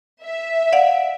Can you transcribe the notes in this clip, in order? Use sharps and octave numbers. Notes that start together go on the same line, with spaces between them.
E5
D5 F5 F#5